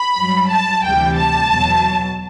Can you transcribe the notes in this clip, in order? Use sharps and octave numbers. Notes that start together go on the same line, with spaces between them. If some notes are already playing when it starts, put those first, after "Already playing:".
Already playing: B5
G2 F#3
A5
D2 C3 E3 G3 G5
A5
E2 B2 F#3